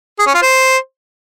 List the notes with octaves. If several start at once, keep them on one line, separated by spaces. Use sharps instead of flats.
G#4
C#4
F4
C5